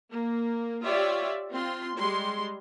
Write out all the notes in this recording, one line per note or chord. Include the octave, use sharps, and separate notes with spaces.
A#3
F4 G4 C#5 D5 E5
C4 F4 C6
G3 G#3 C6